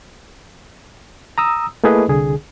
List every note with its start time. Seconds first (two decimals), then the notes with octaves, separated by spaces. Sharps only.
1.38 A#5 D#6 E6
1.84 A3 A#3 E4 G#4 B4 D#5
2.08 C2 D3 G#4